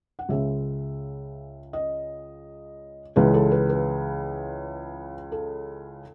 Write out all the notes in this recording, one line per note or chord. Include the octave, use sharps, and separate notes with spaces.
F#5
C#2 C#3 G#3 E5
D#5
C#2 C#3 E3 G#3 B4
A4
B4
B4
A4